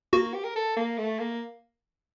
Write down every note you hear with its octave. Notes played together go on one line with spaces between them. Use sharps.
A#3 F#4
G4
A#4
A4
A#3
A3
A#3